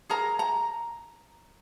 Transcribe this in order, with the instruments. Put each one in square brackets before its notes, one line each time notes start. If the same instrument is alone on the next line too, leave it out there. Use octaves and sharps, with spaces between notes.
[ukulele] G#4 A#4 A#5
A#5